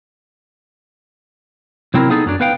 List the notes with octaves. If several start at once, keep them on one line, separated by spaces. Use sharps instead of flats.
C3 F#3 C4 E4 A4 A#4
B3 D#4 G#4 A4
F#2 F#3 D4
B3 B4 F5 G5